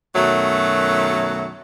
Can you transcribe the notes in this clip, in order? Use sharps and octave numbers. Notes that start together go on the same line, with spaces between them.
F#2 B2 D#3 F#3 A3